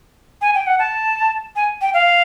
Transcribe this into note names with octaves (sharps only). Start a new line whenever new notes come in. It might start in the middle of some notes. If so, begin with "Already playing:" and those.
G#5
G5
F#5
A5
G#5
G5
F5